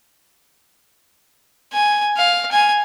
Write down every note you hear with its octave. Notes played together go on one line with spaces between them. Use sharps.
G#5
F5
G#5